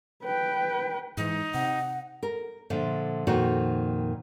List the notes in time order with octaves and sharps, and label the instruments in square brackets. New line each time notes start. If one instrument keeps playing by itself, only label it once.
[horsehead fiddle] B4 G5
[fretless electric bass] G#2 E3 [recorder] D#4
[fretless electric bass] C3 [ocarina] F#5
[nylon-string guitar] A#4
A#2 D3 F3 E5
F2 A#2 D#3 F#4